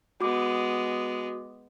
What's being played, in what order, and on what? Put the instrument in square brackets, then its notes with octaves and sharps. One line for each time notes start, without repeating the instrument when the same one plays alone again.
[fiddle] G#3 B3 [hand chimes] F#4 D6